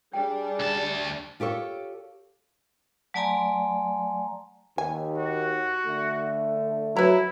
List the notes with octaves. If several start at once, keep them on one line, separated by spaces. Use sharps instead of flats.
G3 D4 G#4 G5
D2 A5
F4 G4 A4 C#5
F#3 A3 D5 G#5 A#5 C6
D#2 G#5
F#4
D3 A3
F#3 E4 B4 A#5